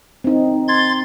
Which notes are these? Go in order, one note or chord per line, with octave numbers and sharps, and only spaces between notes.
C4 D#4
C6 G#6 A6